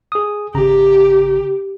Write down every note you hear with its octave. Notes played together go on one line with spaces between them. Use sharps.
G#4 D#6
G#1 C#3 G4 A#5